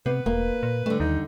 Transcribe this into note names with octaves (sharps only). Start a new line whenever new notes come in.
C3 B3 B4
E1 A#3
A#2
D3 G3 A3
D#2 D#4